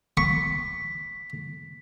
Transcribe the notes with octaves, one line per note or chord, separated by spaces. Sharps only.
C#6 B6